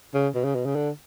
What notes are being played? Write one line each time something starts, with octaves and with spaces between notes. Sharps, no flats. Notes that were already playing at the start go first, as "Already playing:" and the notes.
C#3
B2
C#3
B2
C#3
D3